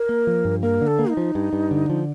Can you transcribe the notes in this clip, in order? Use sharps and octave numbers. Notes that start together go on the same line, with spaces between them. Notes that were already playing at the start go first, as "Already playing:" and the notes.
Already playing: A#4
A#3
F3
G2
A#3 A#4
D3
A4
A#3
D#4
F3
G2
G2
D3
F3